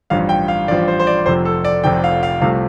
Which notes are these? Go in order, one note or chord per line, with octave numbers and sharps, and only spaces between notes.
A1 G2 F3 F5
G5
F5
A1 G2 F3 D5
C5
C5
D5
F1 F2 C3 F3 C5
A4
D5
F1 F2 C3 F3 G5
F5
F5
C2 C3 F3 A3 F5